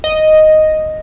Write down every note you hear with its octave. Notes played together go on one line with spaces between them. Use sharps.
D#5